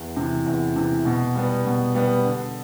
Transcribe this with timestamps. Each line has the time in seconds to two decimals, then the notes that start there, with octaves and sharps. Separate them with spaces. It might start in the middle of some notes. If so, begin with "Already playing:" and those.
Already playing: E2
0.17 C3 E3
0.46 E2
0.76 C3 E3
1.05 B2
1.35 G3 B3
1.65 B2
1.94 G3 B3
2.24 D3